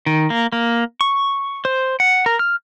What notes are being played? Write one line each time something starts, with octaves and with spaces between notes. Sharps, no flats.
D#3
A#3
A#3
C#6
C5
F#5
A#4
F6